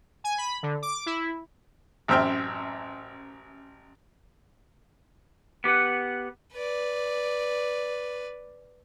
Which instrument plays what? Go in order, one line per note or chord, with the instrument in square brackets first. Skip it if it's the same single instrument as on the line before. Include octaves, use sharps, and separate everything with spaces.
[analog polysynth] G#5
B5
D3
D6
E4
[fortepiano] A1 F#2 C4 E5 G5 F6
[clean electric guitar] B3 G4 B4 F#5
[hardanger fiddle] B4 D5